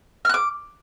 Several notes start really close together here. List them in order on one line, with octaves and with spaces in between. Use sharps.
F6 F#6 D6